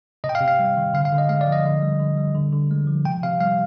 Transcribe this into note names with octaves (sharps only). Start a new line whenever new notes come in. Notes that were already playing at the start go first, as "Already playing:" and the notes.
C3 D#5
G5
F5
C3
F5
G3
D#3
D3 F5
F5
D3
D#5
G#3 F5
D5
F3
D#5
D3
G3
D3
G3
D3
D3
G#3
F3
C3 G5
C3 F5
G3 F5